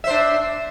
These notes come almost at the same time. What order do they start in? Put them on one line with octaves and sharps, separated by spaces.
E5 C5 D4